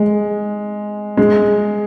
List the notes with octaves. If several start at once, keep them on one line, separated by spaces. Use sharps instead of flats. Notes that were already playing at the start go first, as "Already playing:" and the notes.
Already playing: G#3
G#3